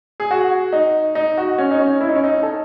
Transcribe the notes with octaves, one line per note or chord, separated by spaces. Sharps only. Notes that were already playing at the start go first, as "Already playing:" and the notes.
G#4
F#4
D#4
D#4
F#4
C#4
D#4
C#4
E4
D#4
C#4
D#4
A4